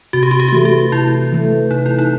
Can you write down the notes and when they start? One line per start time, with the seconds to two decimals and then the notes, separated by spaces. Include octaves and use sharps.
0.13 C3 F#4
0.23 G4
0.31 F#4
0.40 G4
0.48 F#4
0.52 E3 A3 G4
0.65 F#4
0.92 C3 E4
1.32 E3 A3
1.71 C3 D#4
1.86 E4
1.99 D#4